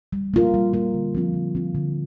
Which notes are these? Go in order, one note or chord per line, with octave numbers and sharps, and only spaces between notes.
G3
A#3 F4 A#4
G3
A#3 F4 A#4
D3
F3 C4 F4
D3
F3 C4 F4
D3